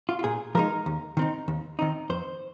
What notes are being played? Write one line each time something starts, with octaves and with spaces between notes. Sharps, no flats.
F4
F4
A#2 G#4
F3 G#3 D#4 A#4
D#2
D#3 C4 D#4
D#2
D#3 C4 D#4
F2 C5